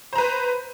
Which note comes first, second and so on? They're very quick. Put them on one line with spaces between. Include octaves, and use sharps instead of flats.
C5 A#5 B4